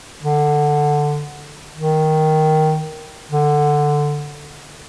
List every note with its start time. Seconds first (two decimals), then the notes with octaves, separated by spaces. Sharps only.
0.23 D3
1.76 D#3
3.30 D3